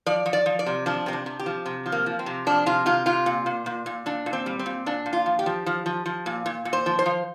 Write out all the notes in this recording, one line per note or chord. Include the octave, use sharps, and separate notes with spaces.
F3 D5
F3
D5
F3
D5
C3
F3 D4
C3 C4
D4
C3
G4
F3
C3
F3
A#3
F3
C4
C3
F3 D4
C3 F4
C3 F4
C3 F4
A#2
A#2
A#2
A#2
A#2 D4
A#2
C4
G3
C4
A#2
A#2 D4
A#2
F4
F3
G4
F3
F3
F3
F3
A#2
A#2
A#2
C5
F3
C5
F3